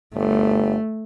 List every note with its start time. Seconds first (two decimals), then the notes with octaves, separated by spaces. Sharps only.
0.16 G1 A3